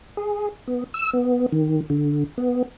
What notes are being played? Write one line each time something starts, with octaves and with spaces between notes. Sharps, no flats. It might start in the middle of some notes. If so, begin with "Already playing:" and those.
G#4
B3
E6
B3
D#3
D3
B3